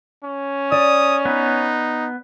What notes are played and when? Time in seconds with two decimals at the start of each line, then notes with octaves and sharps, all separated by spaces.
0.24 C#4
0.72 D5 D#6
1.25 B3 D#4 B4